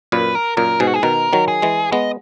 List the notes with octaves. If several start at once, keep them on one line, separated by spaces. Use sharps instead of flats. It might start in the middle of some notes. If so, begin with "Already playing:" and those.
F#2 A#2 B4
A#4
F#2 A#2 A#4
G#2 B2 G#4
F#4
G#4
B2 D#3 A#4
D#3 F#3
G#4
E3 G#3
G#3 B3 D#5